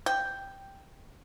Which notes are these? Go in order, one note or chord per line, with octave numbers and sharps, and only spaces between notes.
G5